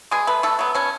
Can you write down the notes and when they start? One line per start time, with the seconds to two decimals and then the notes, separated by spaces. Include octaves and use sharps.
0.11 B2 G#3 G#4
0.27 A3 B3 B4
0.43 B2 A3 A4
0.59 F#3 B3
0.75 B2 C#4